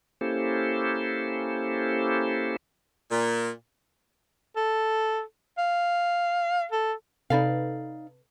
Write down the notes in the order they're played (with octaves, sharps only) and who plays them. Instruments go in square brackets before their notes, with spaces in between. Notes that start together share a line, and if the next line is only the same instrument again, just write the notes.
[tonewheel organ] A#3 C#4 E4 G4 A4 C5
[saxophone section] A#2
[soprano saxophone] A4
F5
A4
[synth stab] C3 A4 B4 [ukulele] D#4 D5 F5